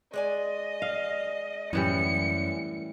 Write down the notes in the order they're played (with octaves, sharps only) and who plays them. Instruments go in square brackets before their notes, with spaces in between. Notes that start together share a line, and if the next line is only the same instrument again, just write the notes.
[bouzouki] G#3 D5 G#5 [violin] D#5
[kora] F5
[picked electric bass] F#2 [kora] A2 E3 G3 [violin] C#7